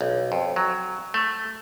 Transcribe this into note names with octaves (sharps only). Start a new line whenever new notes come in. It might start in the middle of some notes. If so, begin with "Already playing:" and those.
B1
F2
F#3
A3